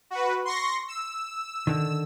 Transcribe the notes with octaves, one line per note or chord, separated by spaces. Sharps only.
F#4 B4
C6 C#6 A#6
E6
D3 D#3